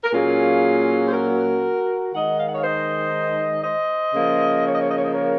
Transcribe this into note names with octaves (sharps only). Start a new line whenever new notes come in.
A#4
A#2 F#3 A#3 C#4 F4 G#4
C5
F#4 A#4
D#3 G#3 D#4 D#5 F#5
F5
F#5
C#5 F5
C5 D#5
C5 D#5
C#3 F3 A#3
C#5
D#5
C#5
D#5
C#5
D#5
A#4 C#5